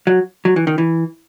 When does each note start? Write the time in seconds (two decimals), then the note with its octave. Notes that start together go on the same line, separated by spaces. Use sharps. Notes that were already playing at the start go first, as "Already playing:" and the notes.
0.07 F#3
0.45 F#3
0.56 E3
0.67 D#3
0.78 E3